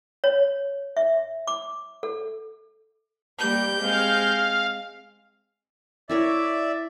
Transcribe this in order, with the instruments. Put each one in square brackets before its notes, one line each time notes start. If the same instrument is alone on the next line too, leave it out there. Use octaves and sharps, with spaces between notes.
[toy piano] C#5
E5
D6
A4
[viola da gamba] G3 A#3 G4 [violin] G6
[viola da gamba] G#3 C4 [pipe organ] F5
[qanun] E4 A#4 C#5 [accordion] D5 E5